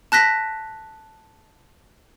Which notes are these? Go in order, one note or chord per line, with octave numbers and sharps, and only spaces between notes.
A5 F#6 A#6 B6